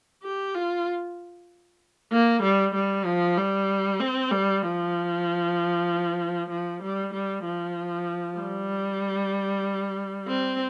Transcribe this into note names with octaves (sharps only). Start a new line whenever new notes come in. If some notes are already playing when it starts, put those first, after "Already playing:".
G4
F4
A#3
G3
G3
F3
G3
C4
G3
F3
F3
G3
G3
F3
G3
C4